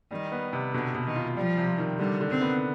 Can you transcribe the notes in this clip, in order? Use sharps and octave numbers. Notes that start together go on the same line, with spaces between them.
D#3 G3
B3
C3
B2 D3
B2
D#3
F4
F3 G3
C3
D#3
D3 G3
D3
C4
B3